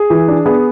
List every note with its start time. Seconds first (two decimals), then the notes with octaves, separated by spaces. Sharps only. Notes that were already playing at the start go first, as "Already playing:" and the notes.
Already playing: G#4
0.10 E3
0.28 D4
0.46 B3 G#4